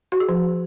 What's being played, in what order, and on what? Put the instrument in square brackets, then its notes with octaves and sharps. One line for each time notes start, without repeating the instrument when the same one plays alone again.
[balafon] F#4
G#4
F3